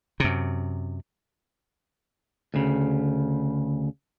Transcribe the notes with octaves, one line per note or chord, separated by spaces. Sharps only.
F#2 C3
D2 C#3